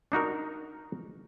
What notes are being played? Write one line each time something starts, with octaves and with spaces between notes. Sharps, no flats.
D4 D#4 F#4 A#4